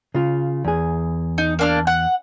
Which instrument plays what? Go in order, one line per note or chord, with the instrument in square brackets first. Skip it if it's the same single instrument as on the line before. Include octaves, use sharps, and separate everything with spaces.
[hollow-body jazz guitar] C#3 F4
E2 G#4
[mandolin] D#4
A#3 D4 F6
F#5